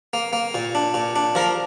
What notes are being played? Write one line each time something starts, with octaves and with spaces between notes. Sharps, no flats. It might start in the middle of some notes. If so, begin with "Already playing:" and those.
A#3
A#3
A#2
D4
A#2
D4
F3 A#4